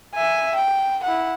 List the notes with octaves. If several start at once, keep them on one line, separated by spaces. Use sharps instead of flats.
E5 G#5
G5
E4 F#5